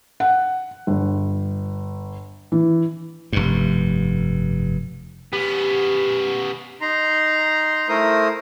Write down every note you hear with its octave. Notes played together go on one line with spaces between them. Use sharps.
F#5
G1
E3
F1 G2
B3 C#4 G4
D#4 A#5 C6
A3 E4 A#4 C5 D#6